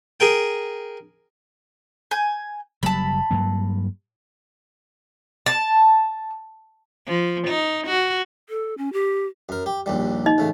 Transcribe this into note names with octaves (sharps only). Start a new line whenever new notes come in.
G#4 A#4 G5
G#5 G6
F#1 F#3 G3 A5 B5
G2 F#3 A#3
A5
F3
D#4
F#4
A4
C#4
G4
F#2 A#4
G4
A#1 D#2 G3
D#4 D#5
A1 C#3 A3